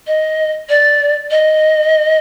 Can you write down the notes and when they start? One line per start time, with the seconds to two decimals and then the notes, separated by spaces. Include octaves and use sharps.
0.07 D#5
0.69 D5
1.31 D#5